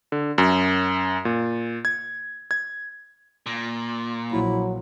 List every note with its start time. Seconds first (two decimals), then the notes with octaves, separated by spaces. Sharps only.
0.12 D3
0.38 F#2
1.25 A#2
1.85 G#6
2.51 G#6
3.46 A#2
4.32 A#1 F#3 E4